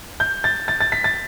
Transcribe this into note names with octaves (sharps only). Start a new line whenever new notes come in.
G6
A6
A6
A6
B6
A6